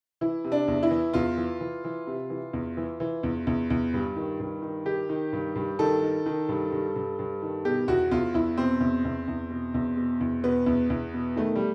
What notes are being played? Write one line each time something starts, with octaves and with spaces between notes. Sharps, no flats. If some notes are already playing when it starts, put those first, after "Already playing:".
E3 E4
C3
D4
E2
E4
E3
E2 F4
E3
E3
E3
C3
E3
E2
E3
E3
E2
E2
E2
G2
D#3
G2
D#3
D#3 G4
D#3
G2
G2
D#3 A4
D#3
D#3
G2
G2
G2
G2
D#3
B2 G4
E2 F#4
E2 F4
E2 E4
B2 C4
E2
E2
E2
B2
E2
B2
E2
B2 B3
E2
E2
B2
D#3 A3
G3